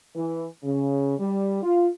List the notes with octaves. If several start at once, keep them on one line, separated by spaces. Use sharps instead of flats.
E3
C#3
G3
F4